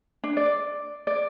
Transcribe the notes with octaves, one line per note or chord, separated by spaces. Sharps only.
D4
D5
D5